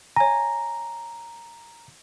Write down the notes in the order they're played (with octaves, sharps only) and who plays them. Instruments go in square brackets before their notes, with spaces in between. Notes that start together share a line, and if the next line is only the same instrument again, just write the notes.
[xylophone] C#5 G#5 [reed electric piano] A#5